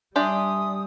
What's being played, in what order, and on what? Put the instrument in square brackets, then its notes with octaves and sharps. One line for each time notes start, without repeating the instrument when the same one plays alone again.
[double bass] G3 [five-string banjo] D4 G4 D5 [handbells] E5 G#5 C6 [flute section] D#6